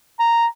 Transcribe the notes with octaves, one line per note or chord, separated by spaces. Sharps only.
A#5